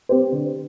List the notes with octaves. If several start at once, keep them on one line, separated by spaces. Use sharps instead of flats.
C4 G4 C5
D3